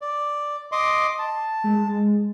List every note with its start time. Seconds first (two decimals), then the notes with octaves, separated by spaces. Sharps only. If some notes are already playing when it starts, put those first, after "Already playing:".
0.02 D5
0.72 D#5 C6 D6
1.19 A5
1.64 G#3